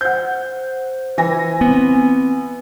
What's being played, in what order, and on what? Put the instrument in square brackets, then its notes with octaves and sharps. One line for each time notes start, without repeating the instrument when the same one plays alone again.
[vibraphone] C5 [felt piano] F#5 G6
[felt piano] E3 G#5 A#6
[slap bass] B3 [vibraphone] C4